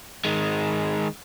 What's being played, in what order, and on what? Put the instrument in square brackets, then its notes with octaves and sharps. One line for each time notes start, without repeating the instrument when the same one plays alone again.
[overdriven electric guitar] D#3 G#3